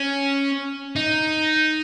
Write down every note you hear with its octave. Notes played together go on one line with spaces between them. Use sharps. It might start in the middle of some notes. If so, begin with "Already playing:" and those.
Already playing: C#4
D#4